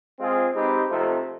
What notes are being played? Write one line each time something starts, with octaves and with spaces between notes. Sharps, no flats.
G#3 C4 F4 G#4 C5
G#3 C4 D#4 G4 B4
C3 F3 A3 C4 D#4